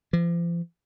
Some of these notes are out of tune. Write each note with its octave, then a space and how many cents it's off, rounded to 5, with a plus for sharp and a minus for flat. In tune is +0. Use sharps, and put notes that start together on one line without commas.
F3 -40